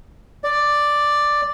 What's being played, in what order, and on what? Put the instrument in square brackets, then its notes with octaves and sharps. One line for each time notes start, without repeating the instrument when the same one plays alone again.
[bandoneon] D5